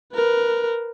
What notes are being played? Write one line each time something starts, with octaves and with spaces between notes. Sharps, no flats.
A#4 B4